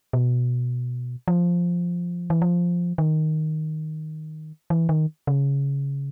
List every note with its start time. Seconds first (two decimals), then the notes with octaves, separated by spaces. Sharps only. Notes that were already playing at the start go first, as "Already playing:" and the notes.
0.13 B2
1.28 F3
2.30 E3
2.42 F3
2.98 D#3
4.70 E3
4.89 D#3
5.27 C#3